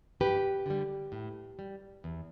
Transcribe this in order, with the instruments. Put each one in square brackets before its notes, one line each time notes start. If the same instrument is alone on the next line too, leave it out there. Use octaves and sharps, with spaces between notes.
[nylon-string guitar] G2 G4 B4
D3 G3
A2
G3
E2